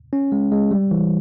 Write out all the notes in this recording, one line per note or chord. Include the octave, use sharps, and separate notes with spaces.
C#4
G#3
G#3
G3
E3